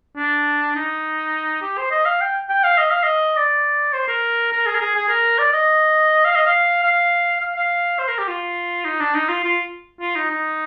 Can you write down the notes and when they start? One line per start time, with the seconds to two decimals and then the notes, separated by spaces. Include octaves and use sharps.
0.17 D4
0.76 D#4
1.62 G4
1.78 C5
1.91 D#5
2.06 F5
2.21 G5
2.49 G5
2.64 F5
2.78 D#5
2.91 F5
3.03 D#5
3.37 D5
3.93 C5
4.08 A#4
4.52 A#4
4.66 G#4
4.75 A#4
4.81 G#4
4.96 G#4
5.09 A#4
5.38 D5
5.53 D#5
6.25 F5
6.36 D#5
6.46 F5
6.84 F5
7.41 F5
7.56 F5
7.99 C5
8.08 A#4
8.19 G4
8.28 F4
8.85 D#4
9.00 D4
9.15 D#4
9.29 F4
9.44 F4
10.01 F4
10.16 D#4
10.31 D#4